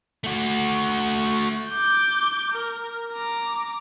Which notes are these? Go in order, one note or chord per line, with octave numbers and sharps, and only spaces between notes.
A3 F#4
D6 G6
A#4
A#5 D6